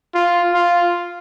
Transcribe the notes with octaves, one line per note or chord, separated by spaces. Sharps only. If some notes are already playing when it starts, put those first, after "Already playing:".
F4
F4